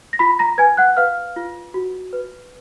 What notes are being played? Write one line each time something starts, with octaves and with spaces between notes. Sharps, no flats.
A#6
F4 B5 B6
A#5 A#6
B4 G#5 G#6
F#5 F#6
B4 F5 F6
F4
F#4
B4